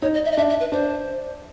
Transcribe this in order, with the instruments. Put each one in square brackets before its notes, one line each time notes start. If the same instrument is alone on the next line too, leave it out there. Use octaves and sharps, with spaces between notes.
[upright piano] D#4 [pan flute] C#5
[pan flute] D#5
E5
D#5
[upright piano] D4 [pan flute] E5
[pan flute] E5
B4
[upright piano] D4 [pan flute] C5